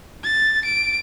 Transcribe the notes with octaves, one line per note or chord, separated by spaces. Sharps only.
A6
D7